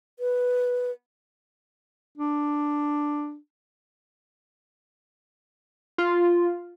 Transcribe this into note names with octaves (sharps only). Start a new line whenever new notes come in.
B4
D4
F4